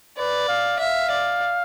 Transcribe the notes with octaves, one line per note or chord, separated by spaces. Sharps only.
B4 D5
F5
E5 F5
D5